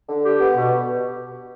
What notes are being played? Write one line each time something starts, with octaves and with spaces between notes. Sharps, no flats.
D3
G4
B3
B2